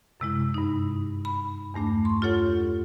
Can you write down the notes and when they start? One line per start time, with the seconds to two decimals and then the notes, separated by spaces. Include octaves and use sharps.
0.20 F#2 C3 G#3 E4
0.54 G2 D#4
1.25 B5
1.74 E2 G2 A3 D4
2.05 C6 C#6
2.22 F4 G4 A4 C#5 F#5